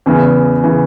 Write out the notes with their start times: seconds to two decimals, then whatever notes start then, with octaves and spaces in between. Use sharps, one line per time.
0.06 E2 C#3 E3
0.63 C#3 E3